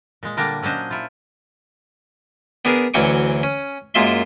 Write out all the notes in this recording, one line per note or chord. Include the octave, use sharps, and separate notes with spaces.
A#2 G#3
D3 G3 A#3 D4 G4 A#4
F#3 C#4 D4 C5 D#5
E4 F4
B3 D4 G#4 A#4
D2 E3 F#3 C#4 C#6 D6
C#4
F#2 G#3 A#3 F4 E5 C6